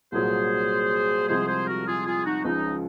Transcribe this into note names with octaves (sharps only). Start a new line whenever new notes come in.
C2 A#2 F#3 G#4 C5
C2 C3 F3 G#3 G#4 C5
G#4 C5
F#4 A#4
F4 G#4
F4 G#4
D#4 F#4
C#2 C#3 F3 D#4